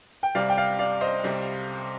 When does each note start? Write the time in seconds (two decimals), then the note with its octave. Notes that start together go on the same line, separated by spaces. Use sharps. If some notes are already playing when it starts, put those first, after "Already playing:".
0.23 G5
0.35 C2 C3 G3 D5 F5
0.49 G5
0.57 D5 F5
0.79 D5 F5
1.01 C5 D#5
1.24 C2 C3 G3